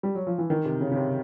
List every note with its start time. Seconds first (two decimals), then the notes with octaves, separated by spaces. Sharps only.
0.03 G3
0.15 F#3
0.27 F3
0.38 E3
0.50 D#3
0.65 C3
0.81 C#3
0.92 C#3
0.96 C3